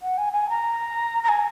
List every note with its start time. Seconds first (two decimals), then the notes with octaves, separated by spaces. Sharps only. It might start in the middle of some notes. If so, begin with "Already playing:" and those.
0.02 F#5
0.18 G#5
0.33 G#5
0.50 A#5
1.24 A#5
1.29 G#5